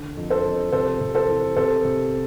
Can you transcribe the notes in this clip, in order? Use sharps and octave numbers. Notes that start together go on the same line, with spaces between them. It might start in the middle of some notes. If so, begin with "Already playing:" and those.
Already playing: D3
F2
A4 C5
F2
C3 A4 C5
C3
A4 C5
E3
C3 A4 C5
C3